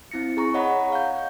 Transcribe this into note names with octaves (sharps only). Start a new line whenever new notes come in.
C4 E4 A#6 C#7
G#4 A#5 C#6
C#5 D#5 F#5 A#5 B5
F5 G6